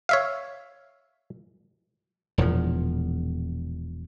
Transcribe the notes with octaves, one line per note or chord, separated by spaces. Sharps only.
C#5 E5 F5
E1 E2 A#2 F3